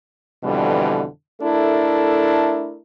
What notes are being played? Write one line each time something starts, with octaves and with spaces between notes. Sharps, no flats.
F2 B2 D3 E3 G3
A3 D4 E4 A4 A#4